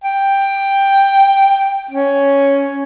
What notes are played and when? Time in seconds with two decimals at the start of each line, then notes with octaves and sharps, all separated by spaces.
0.04 G5
1.91 C#4